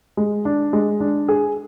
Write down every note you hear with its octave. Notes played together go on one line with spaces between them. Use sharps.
G#3
D4
G#3
D4
G#4